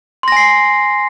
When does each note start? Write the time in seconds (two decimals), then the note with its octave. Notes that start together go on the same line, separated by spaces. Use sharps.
0.23 C6
0.28 A#6
0.32 G#5
0.37 C7